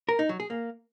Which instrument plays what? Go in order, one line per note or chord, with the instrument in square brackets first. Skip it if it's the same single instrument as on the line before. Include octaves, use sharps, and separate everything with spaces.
[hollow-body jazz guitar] A#4
D#4
F#3
G#4
A#3